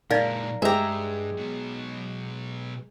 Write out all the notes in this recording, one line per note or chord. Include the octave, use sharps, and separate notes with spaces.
A#2 G#3 D#4 A#4 D5 F5
G2 G#3 G4 E5 A#5
B2 F#3